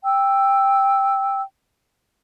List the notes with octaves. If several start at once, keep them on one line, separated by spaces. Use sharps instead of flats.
G5 E6